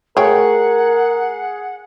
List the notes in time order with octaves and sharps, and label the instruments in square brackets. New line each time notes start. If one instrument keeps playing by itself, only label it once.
[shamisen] A3 C#5 G5 [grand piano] G#4 [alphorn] A#4 [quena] F#5